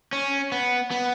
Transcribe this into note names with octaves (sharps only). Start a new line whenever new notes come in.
C#4
B3
B3